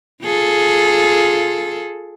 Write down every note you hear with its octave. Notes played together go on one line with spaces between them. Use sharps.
F4 G#4 A4